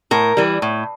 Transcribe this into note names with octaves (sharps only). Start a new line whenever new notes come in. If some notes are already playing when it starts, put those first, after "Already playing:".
A2 A#4
E3 G3
A2